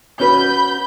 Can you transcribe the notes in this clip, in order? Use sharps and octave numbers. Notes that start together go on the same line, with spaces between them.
C#4 F#4 B4 B5 G6